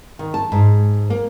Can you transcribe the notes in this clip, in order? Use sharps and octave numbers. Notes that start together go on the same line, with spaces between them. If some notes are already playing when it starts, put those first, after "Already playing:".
D#3
A5
G#2
A#3